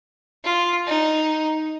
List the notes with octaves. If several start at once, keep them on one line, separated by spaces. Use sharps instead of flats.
F4
D#4